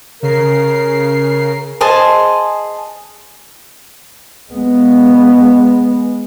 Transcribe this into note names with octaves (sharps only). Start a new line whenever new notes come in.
C#3 A#4 C7
G#4 C5 D#5 A5
G#3 B3